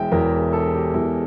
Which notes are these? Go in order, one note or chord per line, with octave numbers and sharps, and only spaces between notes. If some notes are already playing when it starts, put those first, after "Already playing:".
Already playing: E1 E2 E3 E5 G5
E1 E2 E3 A#4
A4
G4
E1 E2 E3 E4